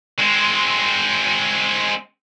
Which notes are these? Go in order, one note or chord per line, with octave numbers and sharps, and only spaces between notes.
G#3 C4